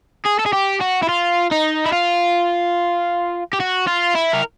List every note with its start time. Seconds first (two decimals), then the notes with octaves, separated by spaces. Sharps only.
0.25 G#4
0.39 A4
0.46 G#4
0.53 G4
0.81 F#4
1.03 E4
1.09 F4
1.51 D#4
1.86 E4
1.93 F4
3.53 G4
3.60 F#4
3.88 F4
4.15 E4
4.34 A#4